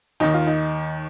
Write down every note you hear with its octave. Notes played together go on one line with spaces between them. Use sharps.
D#2 D#3 D#4
F4
D#4